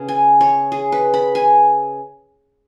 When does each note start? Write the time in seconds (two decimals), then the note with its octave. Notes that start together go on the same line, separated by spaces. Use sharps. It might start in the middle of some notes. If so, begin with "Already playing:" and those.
Already playing: C#3 B3 C#5
0.08 G#5
0.41 C#5
0.72 G#4
0.92 B4
1.14 B5
1.35 G#5